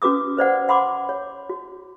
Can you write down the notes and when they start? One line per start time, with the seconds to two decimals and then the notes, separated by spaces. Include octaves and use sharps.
0.02 C#4 F#4 B4 D6 D#6
0.37 B4 C5 D5 F#5
0.69 F#5 B5 C6 D6
1.09 C#5
1.49 F#4